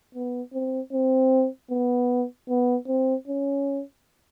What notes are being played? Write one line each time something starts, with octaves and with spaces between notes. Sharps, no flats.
B3
C4
C4
B3
B3
C4
C#4